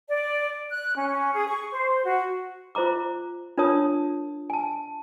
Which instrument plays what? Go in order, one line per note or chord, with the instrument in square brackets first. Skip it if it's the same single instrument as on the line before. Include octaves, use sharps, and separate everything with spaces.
[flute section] D5
F#6
C#4
G#4
C#6
C5
F#4
[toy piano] F4 C5 E5 A#5 D6
D4 F4 A#4 C#5 A5 D#6
G#5 A5